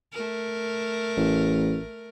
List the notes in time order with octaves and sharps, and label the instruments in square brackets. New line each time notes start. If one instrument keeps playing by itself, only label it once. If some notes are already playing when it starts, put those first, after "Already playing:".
[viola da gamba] A3 A#4
[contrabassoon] A1